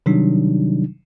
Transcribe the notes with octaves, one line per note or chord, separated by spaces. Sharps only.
C3 D#3 F#3 G3 D4 D#4